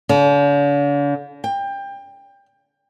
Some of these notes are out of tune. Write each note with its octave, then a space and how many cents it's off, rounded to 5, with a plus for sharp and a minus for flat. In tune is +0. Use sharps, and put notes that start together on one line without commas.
D3 -45
G5 +25